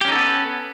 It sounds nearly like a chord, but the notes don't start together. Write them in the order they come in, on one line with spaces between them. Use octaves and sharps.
G4 C#4 D#4 A4 B3